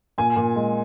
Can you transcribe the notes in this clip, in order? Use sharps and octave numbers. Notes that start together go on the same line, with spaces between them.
A#2 G#5
A#2
G#3